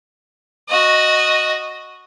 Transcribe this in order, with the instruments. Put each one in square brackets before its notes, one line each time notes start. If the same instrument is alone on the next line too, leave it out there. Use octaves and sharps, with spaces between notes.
[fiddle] F#4 D#5